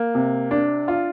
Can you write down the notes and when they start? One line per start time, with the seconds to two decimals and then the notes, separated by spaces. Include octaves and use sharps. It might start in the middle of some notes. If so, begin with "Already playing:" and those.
Already playing: A#3
0.15 C3
0.51 D4
0.88 F4